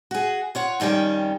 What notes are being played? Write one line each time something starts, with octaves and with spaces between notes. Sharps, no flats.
F#4 G#4
F4 C#5 F#5
F2 D#3 G3 C#4 G5